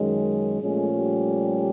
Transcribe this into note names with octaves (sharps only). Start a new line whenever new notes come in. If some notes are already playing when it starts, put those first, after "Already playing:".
Already playing: F#2 D#3 G#3 C#4
A#2 F3 G#3 A3 C#4 G#4
G3 G4